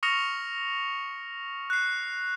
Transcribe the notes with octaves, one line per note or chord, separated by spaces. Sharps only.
C#6 D#6 F6 A#6 C#7 F7
F#6 C7